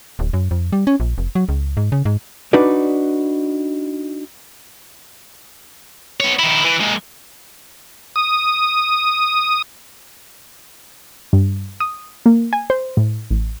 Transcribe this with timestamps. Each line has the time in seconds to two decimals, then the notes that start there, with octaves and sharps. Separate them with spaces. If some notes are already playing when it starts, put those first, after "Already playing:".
0.19 D1
0.33 F#2
0.51 F2
0.73 G3
0.87 C#4
1.00 A#1
1.18 F1
1.35 F#3
1.49 C#2
1.77 G#2
1.92 C#3
2.05 G#2
2.53 D4 D#4 F#4 B4 D5
6.20 B3 C#5
6.39 D#3 E4
6.65 E3
6.81 G#3 A#3
8.16 D#6
11.33 G2
11.80 D#6
12.26 A#3
12.53 G#5
12.70 C5
12.97 A2
13.30 A1